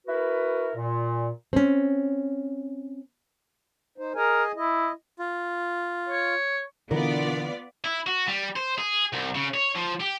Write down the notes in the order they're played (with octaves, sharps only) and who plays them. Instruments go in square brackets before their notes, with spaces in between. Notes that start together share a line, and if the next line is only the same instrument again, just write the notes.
[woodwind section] E4 F#4 A#4 B4
A#2
[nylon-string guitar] C4 C#4
[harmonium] D#4 C5
[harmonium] G#4 D#5 G#5 [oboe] A#4
[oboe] E4 [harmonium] D#5
[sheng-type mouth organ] F4
[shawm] C#5
[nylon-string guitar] B2 D4 A#4 [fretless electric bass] D3 E3 [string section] B3 F4 D5
[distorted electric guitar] E4
F#4
G3
C5
G#4
C2
C#3
C#5
F3
G4